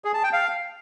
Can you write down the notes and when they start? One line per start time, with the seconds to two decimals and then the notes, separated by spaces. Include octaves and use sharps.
0.05 G#4
0.14 A5
0.23 G5
0.33 F5